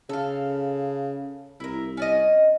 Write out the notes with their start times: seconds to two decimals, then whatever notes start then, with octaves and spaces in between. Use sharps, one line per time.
0.09 C#3 A4 F5
1.60 C2 E4 A#4
1.97 C#4 D5 D#5